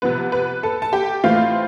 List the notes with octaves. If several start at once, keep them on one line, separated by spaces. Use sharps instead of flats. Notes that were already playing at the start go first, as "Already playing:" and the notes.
C3 F3 B3 B4
B4
A4 A5
A5
G4 G5
A2 E3 A3 C4 F4 F5